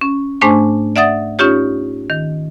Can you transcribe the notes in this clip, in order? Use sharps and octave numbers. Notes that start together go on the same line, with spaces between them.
C#4
G#2 A3 D4 C5 G#5 C#6
D5 E5 F#5 D#6 A6
C#4 D#4 F4 G4 C#5
D#3